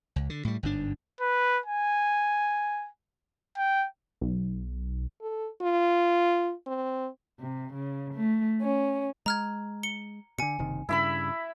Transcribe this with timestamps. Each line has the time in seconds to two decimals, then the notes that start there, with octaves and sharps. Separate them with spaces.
0.16 C#2
0.30 D3
0.45 A2 G3
0.63 G1 G#2 D4
1.21 B4
1.66 G#5
3.57 G5
4.21 B1
5.21 A4
5.61 F4
6.67 C4
7.40 C3
7.73 C#3
8.13 A3
8.61 C#4
9.26 G#3 A#5 F6 G#6
9.83 C#7 G7
10.39 B2 D3 G#5 C#7
10.59 F#1 C3 D#3
10.89 G2 C#3 E4 E5 B5